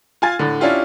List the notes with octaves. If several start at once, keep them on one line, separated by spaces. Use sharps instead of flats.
F4 G#5 A6
A2 D3
C#4 D4 E4 F4 G4